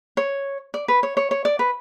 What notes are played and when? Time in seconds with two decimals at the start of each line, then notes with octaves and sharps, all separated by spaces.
0.17 C#5
0.74 D5
0.88 B4
1.03 C#5
1.17 C#5
1.31 C#5
1.45 D5
1.59 B4